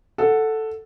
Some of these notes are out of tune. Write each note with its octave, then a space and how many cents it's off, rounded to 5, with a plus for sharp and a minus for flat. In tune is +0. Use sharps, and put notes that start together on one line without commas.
A4 +0 F#5 -5